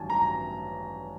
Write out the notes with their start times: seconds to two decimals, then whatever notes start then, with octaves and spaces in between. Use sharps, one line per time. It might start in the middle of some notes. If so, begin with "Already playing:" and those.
Already playing: A1 G2 D#3 F#3 B3 G#5 A5
0.10 A#5